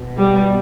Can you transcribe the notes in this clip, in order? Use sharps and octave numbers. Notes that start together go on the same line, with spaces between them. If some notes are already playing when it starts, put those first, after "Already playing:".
Already playing: B2
G3